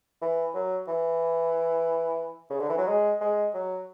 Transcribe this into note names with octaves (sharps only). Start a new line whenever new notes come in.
E3
F#3
E3
C#3
D3
E3
F#3
G#3
G#3
F#3